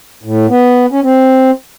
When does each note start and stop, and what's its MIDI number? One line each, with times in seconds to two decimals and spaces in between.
0.24 0.46 45
0.49 0.86 59
0.92 1.00 61
1.03 1.51 60